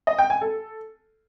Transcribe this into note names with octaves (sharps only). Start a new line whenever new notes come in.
D#5
G5
G#5
A4